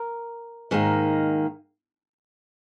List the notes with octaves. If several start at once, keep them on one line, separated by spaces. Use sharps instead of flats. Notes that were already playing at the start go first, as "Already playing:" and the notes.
Already playing: A#4
G#2 D#3 A#3